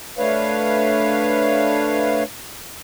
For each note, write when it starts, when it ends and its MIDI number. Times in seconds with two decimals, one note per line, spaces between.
0.18 2.23 57
0.18 2.23 62
0.18 2.23 71
0.18 2.23 73
0.18 2.23 77